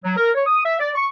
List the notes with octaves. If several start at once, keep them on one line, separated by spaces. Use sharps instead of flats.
F#3
A#4
C#5
D#6
E5
D5
C#6